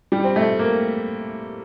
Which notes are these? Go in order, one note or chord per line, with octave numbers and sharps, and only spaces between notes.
G3
C4
A3
A#3